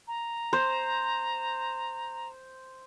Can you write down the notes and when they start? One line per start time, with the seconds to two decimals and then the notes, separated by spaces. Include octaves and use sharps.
0.08 A#5
0.53 C5